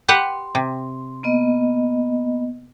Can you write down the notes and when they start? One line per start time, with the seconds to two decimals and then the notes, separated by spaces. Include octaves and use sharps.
0.08 G4 B4 F#5 C6
0.55 C3
1.23 A#3 B3 D#5